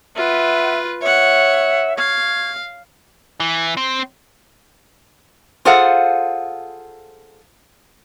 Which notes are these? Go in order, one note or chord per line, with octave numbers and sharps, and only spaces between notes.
F4 B4 E5 F#5
C#5 E5 F#5
F5 C#6 G#6
E3
C4
F4 G#4 A4 C5 F5 F#5